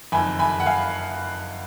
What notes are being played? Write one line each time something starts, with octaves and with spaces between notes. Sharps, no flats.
F#1 F2 D#3 G#5 B5
G#5 B5
F#5
F5 G#5